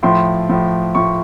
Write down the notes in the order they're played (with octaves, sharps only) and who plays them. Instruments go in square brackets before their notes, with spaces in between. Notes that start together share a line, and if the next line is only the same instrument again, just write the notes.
[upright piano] A2 F3 C6
A2 F3
A2 F3 C#6